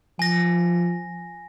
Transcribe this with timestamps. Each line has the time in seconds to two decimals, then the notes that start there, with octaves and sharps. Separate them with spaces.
0.19 F3 G#5 A#6